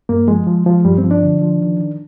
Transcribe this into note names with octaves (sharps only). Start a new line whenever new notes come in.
G2 A#3
F3 G#3
F3
F3
G2 G3
C4
F3
D4
D3
F3
D#3
D#3